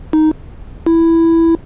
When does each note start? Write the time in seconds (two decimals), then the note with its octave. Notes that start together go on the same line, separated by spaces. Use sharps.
0.13 D#4
0.86 E4